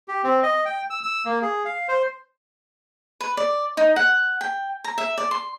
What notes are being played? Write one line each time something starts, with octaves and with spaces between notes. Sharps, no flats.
G4
C4
D#5
G5
E6
E6
A#3
G#4
F5
C5
B4
D5
D#4
F#5
G5
A#5
E5
D5
C6